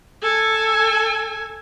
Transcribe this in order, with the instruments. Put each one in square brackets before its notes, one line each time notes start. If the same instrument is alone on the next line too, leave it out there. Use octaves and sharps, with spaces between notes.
[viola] A4 G#5